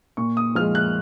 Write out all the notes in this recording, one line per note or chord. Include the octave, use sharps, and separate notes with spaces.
A#2 C#6
D#6
F3 G#3 F6
F#6